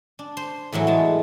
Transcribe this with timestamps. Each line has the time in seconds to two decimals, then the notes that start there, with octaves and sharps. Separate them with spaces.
0.19 D4
0.37 C5
0.72 E2 A2 E3 F#3
0.87 G#3 A5